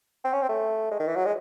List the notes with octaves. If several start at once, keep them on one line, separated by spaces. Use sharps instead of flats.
C4
C#4
C4
A3
G#3
D#3
E3
F#3
G#3